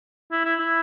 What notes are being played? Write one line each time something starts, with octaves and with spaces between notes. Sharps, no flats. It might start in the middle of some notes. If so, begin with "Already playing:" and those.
E4
E4
E4